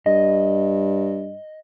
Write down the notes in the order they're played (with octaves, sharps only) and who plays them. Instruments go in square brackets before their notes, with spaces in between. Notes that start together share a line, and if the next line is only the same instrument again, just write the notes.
[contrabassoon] G2 [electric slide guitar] D#5